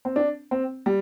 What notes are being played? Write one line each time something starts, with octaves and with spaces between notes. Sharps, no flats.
C4
D4
C4
G3